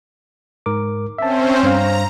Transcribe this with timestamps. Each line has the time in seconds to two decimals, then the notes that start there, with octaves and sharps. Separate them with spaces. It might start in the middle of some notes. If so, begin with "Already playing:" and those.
0.66 G#2 A#4 D6
1.18 C4 C#4 C5 E5 A5
1.63 G2 C5 F5 A#5